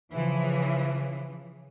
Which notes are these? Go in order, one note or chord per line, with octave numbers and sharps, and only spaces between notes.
C#3 E3 F3